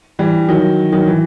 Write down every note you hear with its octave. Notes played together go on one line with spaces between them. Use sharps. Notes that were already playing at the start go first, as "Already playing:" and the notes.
E3 G3
D#3 F#3
D#3 F#3
E3